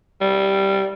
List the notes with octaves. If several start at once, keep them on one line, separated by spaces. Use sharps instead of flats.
G3